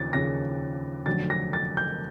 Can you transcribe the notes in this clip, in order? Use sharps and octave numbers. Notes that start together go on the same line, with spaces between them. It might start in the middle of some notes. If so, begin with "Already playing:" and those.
Already playing: D#2 C#3 F3 A6
D#2 C#3 F3 A#6
F1 F2 D3 F#3 A6
A#6
A6
G6